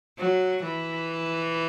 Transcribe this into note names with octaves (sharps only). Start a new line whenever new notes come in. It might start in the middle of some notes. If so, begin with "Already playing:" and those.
F#3
E3